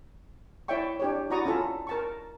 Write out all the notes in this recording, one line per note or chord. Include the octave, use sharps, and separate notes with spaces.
E4 C#5 D5 E5 G5 C#6
D4 G4 C#5
E4 F#4 D5 A#5 C#6 D#6
C#4 F4 A4 B5
A#4 A5 C#6